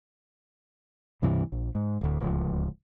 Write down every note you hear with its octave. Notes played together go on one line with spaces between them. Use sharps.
C#2 G2 C3 E3
A#1
G#2
D1 D2
D1 C#2 F3